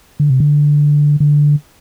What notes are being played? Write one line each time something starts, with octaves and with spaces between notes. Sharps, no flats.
D3
C3
D3
D3